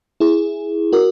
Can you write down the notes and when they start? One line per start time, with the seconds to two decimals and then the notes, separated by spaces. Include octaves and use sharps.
0.20 E4 G#4
0.92 F#4 A#4